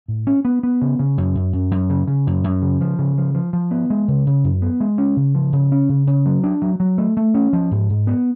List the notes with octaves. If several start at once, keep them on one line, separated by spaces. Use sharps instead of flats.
A2
C#4
B3
B3
C#3
C#3
F#2
F#2
F#2
F#2
C#3
C#3
F#2
F#2
C#3
F3
C#3
F3
F3
F3
B3
G#3
C#3
C#3
F#2
B3
G#3
C#4
C#3
F3
C#3
C#4
C#3
C#3
F#3
D4
F#3
F#3
A3
A3
C#4
F3
G#2
G#2
B3